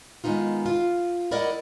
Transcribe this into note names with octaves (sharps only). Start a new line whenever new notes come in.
D#3 G#3 B3 D#4 F4
F4
E4 A#4 D5 D#5 F#5